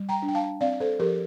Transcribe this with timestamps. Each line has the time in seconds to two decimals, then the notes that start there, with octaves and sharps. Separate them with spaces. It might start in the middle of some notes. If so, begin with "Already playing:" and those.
Already playing: G3
0.09 G5 A#5
0.22 D4
0.28 G5
0.35 F5 A5
0.61 C4 D5 F5
0.80 A4 C5
0.99 F3 G4 A#4